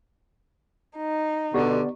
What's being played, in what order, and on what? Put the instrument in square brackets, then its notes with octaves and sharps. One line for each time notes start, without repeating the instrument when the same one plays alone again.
[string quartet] D#4
[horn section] B2 D3 [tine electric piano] B3 D5 [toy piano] G4